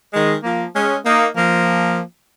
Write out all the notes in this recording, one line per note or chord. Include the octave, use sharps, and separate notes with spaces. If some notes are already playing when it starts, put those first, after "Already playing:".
D#3 G#3
F3 A#3
G#3 C#4
A#3 D#4
F3 A#3